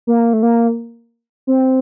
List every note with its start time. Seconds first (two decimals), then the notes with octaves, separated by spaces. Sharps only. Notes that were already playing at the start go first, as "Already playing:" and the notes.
0.07 A#3
0.33 A3
0.43 A#3
1.47 C4